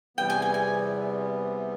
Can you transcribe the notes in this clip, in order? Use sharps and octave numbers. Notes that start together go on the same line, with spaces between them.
E2 C3 E3 G3 B3 G5
G#5
G#5
G#5